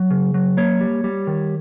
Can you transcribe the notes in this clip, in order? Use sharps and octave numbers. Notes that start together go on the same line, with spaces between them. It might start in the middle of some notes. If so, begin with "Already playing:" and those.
Already playing: F#3
C#3
F#3
A#3 C#5
G3
G3
D#3